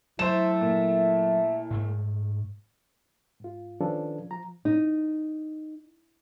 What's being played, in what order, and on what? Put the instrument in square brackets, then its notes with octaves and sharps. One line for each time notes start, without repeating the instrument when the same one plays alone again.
[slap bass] F#3 [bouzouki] A3 [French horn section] E4 [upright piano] C5 E7
[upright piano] A#2
[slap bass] G#2 A3
[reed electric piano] G#2 F4
D#3 F3 C#4 D4 A4 B4
F3 A#5
[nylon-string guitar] D#4